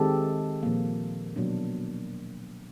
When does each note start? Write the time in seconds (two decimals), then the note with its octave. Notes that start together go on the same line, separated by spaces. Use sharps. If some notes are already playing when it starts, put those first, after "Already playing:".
Already playing: D#3 G#3 C4 G4 A4
0.63 A#2 F3 A#3
1.36 B2 F#3 A#3 D4